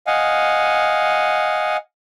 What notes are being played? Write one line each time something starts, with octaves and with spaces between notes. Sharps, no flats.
D#5 F5 F#5 G#5